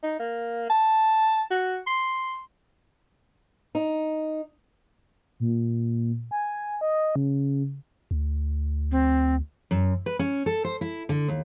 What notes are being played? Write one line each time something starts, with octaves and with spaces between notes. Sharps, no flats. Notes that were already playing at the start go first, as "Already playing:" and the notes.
D#4
A#3
A5
F#4
C6
D#4
A#2
G#5
D#5
C#3
D2
C4
F#2
B4
C#4
A4
C5
E4
D3
D#2